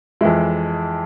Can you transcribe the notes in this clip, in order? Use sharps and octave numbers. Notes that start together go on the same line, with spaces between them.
F2 E3 G#3 E4